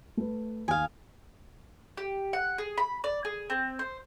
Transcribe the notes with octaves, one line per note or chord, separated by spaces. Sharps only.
A3 B4
D#2 F5 G#5 D#6
G4
F#5
G#4
B5
D5
G#4
C4
C5